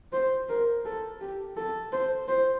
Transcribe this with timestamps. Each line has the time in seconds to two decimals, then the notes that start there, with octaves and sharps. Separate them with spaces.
0.13 C5
0.49 A#4
0.85 A4
1.21 G4
1.57 A4
1.92 C5
2.28 C5